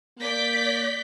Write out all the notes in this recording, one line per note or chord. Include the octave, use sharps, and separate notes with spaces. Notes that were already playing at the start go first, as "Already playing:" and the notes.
A#3 D5 G6 B6